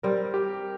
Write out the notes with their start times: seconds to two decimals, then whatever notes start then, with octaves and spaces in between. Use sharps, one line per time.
0.03 G3 C4 A#4
0.34 G4